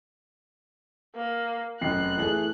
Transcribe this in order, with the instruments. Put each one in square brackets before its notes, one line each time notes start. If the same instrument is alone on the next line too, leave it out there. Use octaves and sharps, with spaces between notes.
[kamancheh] A#3
[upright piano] F1 F#2 C7 [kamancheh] F#6
[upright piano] E3 A3 G#4